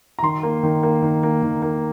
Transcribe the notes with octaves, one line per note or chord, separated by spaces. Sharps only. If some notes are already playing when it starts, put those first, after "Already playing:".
A#5
D#3 C6
A#3
D#3
A#3
D#3
A#3
D#3
A#3